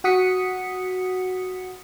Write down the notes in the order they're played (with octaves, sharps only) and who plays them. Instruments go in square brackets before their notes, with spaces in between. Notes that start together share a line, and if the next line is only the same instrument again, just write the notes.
[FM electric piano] F#4 F#5 D#6 B6 C#7